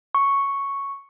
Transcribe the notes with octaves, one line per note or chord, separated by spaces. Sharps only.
C#6